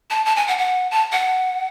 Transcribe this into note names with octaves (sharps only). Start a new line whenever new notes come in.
A5
A5
G#5
F#5
F#5
A5
F#5